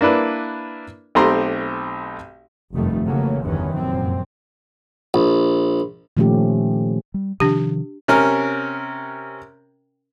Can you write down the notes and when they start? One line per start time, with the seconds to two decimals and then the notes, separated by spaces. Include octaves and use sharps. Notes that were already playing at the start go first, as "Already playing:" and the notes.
0.01 A#3 D4 E4 B4
1.15 B1 A3 C4 G4 A#5 C6
2.73 F1 G2 D#3 F3 G3 A3
3.05 C#3 E3 F#3 A3 A#3 C#4
3.42 G1 E2 G2 D#3 E3 C#4
3.74 F1 F#2 A#2 C4
5.14 A#1
6.17 A#2 D#3 F3 A3 C#4 G4
7.14 G3
7.40 C3 D#3 F3 D4 G4
8.08 C3 C#4 A#4